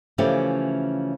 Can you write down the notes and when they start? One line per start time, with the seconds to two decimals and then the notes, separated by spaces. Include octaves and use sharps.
0.18 C#3 E3 F3 A3 C#4 G4